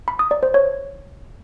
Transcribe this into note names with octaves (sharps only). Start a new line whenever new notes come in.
B5
D#6
D5
C5
C#5